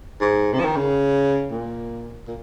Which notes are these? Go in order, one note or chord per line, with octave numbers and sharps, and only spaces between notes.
G#2
C3
F3
D#3
C#3
A#2
A#2